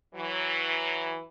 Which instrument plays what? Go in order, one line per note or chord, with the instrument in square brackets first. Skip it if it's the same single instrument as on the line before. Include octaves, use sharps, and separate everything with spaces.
[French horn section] E3 F#3